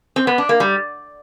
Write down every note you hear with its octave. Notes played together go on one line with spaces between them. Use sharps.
C4
B3
D4
A#3
G3